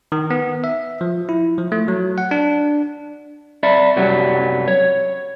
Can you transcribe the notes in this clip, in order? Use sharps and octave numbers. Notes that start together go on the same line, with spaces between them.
D#3
B3
E5
F3
E4
F3
A3
F#3
F#5
D4
D5 E5 B5
C2 F#2 F#3 G3 B3
C#5